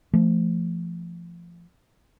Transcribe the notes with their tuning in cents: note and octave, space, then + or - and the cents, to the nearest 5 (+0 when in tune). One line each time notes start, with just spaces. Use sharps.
F3 -25 A3 +10